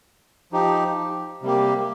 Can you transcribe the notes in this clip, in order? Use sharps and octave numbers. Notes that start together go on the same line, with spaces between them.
F3 D#4 G4
C3 G3 A#3 G4